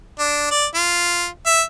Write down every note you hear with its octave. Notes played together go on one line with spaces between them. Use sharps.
D4
D5
F4
E5